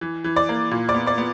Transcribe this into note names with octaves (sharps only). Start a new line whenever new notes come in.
E3
E3
D5 D6
A#3
A#2
D5 D6
B3
D5 D6
B3